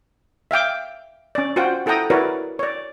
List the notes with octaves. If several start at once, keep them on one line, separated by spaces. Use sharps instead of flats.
E5 F5 G5 D6
C#4 D5
F4 F#4 C5 F#5 G5
E4 A4 F#5 G5 A#5 D#6
E4 F#4 A#4 B4 C#5 D5
C#5 D5